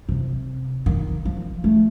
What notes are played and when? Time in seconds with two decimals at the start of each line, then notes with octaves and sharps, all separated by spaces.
0.09 C3
0.86 D#3
1.25 F3
1.64 A3